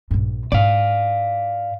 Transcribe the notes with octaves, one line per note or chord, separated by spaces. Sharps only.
A#1 G2
G#2 E4 D5 F5